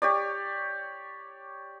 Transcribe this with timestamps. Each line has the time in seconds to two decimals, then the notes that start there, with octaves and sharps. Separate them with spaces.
0.02 G4 C#5 D5